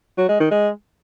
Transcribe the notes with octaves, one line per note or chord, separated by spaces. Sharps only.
F#3
G#3
D#3
G#3